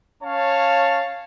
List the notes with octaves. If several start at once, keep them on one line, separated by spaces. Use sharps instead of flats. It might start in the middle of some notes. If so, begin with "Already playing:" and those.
C#4 C#5 F5 A5